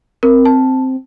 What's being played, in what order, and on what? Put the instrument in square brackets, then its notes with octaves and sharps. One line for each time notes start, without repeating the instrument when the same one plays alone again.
[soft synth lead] C4 [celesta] A#4
[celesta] A5